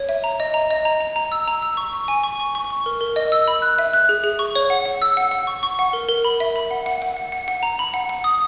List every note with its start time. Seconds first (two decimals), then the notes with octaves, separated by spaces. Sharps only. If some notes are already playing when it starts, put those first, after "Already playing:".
Already playing: C#5
0.09 E5
0.24 A#5
0.40 D#5
0.54 A#5
0.71 D#5
0.85 A#5
1.01 A#5
1.16 A#5
1.32 E6
1.48 A#5
1.62 E6
1.77 C#6
1.93 C#6
2.08 G#5
2.24 C#6
2.40 C#6
2.55 C#6
2.70 C#6
2.86 A#4
3.01 A#4
3.16 D#5
3.32 E6
3.48 B5
3.62 F#6
3.79 E5
3.93 F#6
4.09 G#4
4.24 G#4
4.39 C#6
4.55 C#5
4.70 F#5
4.86 F#5
5.02 E6
5.17 F#5
5.31 F#5
5.47 C#6
5.63 C#6
5.79 F#5
5.93 A#4
6.08 A#4
6.25 B5
6.40 E5
6.56 B5
6.71 F#5
6.86 F#5
7.02 F#5
7.17 F#5
7.32 F#5
7.48 F#5
7.63 A#5
7.79 B5
7.94 F#5
8.09 F#5
8.24 D#6